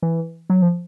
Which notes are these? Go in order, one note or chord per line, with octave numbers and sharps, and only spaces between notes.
E3
F#3
F3